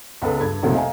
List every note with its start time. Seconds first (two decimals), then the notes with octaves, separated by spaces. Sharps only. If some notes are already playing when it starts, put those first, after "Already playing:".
0.22 C#2 B3 A4 B4
0.39 G2 A4 G#6
0.63 B1 F2 C3 F#3 A3 A#3
0.75 D#5 F5 G#5 A#5